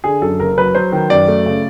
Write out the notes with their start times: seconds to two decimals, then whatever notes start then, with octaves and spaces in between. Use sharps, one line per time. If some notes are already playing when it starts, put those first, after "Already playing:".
0.04 D3 G#4
0.22 F#2 A4
0.40 F#1 A#4
0.58 F#3 B4
0.75 F#3 C5
0.92 D#3
1.10 F#2 D5
1.28 A3
1.46 C#3